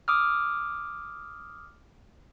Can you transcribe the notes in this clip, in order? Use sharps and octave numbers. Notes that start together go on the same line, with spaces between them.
D6 D#6 F6